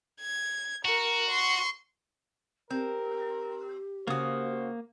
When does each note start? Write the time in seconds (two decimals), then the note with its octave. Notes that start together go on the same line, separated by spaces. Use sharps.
0.21 G#6
0.85 F#4 A#4
1.31 C6 C#6
2.70 C4 G4 A#4
4.07 C#3 A#3 F#4 C5 D#6